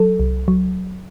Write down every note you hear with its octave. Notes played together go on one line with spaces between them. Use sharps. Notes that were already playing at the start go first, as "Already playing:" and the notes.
Already playing: F#3 A4
C2
F#3